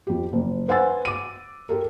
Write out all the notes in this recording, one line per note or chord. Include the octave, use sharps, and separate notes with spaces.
F2 G4
F#1
B4 C5 F#5 G#5 E6 A6
D6 D#7
G4 A4 A#4